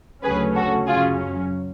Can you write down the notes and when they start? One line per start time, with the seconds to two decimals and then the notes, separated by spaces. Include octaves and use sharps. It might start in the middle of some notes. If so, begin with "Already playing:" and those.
0.23 D2 C#3 F#3 A3 C#4 G#4 B4
0.55 F#4 A4
0.87 F#2 C#3 F#3 C#4 F4 G#4